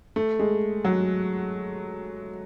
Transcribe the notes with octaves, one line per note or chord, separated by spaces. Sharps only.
A3
G#3
F#3